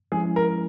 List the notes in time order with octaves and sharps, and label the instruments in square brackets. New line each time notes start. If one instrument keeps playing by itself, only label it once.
[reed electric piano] F3 G#3 C#4 E4 [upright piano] G#4
[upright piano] A#4